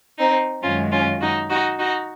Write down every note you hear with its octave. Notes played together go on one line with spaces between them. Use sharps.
C4 D#4
F#2 D#3 G#3 C#4 F4
C#4 F4
D#4 F#4
D#4 F#4
D#4 F#4